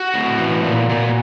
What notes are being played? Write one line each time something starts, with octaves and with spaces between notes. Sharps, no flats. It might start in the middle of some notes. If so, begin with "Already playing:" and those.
Already playing: F#4
A2
E3
A#2
A#2